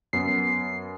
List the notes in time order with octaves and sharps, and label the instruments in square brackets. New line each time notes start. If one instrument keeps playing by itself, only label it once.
[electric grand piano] F#2 B3 [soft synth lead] C7